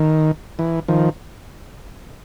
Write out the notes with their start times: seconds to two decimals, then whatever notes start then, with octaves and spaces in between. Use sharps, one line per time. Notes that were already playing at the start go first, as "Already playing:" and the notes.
Already playing: D#3
0.59 E3
0.88 D#3 F3